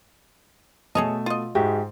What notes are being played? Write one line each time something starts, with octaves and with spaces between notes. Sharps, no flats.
B2 A3 G#4 C#5 D#5 A5
F4 D#5
G#2 G#3 F#4 G4 E5